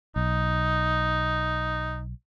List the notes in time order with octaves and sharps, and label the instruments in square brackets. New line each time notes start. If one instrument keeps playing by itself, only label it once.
[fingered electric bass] B1 [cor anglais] D#4